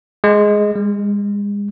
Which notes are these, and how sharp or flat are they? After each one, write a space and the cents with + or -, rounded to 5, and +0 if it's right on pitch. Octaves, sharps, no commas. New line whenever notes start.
G#3 +5
G#3 -35